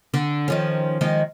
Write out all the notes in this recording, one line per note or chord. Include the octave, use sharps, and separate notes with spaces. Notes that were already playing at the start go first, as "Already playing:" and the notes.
D3
D#3 F3 C#4
D#3 F3 G#3